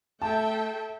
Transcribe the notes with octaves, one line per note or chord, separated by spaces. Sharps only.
A3 A4 E5 G5 A5